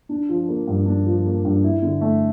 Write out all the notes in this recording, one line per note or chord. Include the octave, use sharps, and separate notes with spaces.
D4
F3
A#3
G2
D4
F3
A#3
G2
E4
D3
A3